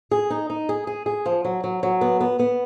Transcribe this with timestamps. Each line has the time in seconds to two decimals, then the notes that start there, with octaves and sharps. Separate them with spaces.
0.11 G#4
0.30 D#4
0.50 D#4
0.69 G#4
0.87 G#4
1.06 G#4
1.26 F3
1.45 F#3
1.64 F#3
1.83 F#3
2.01 B3
2.20 B3
2.39 B3